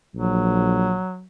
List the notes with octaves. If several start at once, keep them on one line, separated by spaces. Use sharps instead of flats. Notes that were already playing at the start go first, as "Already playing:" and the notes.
A#1 F#3